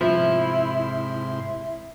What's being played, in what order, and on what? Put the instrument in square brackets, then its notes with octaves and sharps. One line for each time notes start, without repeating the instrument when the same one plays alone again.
[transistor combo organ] G#2 C3 C6 [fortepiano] F3 F4 E5 [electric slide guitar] E4